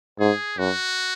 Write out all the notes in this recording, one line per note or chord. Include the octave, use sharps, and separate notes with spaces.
G#2 G#4
F#2 F#4